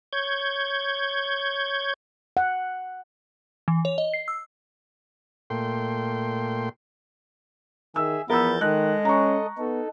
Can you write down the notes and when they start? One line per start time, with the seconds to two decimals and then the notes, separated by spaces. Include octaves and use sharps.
0.13 C#5 G6 G#6
2.37 F#5
3.68 E3
3.85 C#5
3.98 D#5
4.14 C7
4.28 E6
5.50 A#2 A3 G5 C6
7.96 D#3 G#4 E5 E6
8.30 E2 F3 B3 A#4 E6 G6 A6
8.61 D#3 G#3 A4 D#5 F#6
9.05 C#4 A#5 C#6
9.58 B3 D#4 A4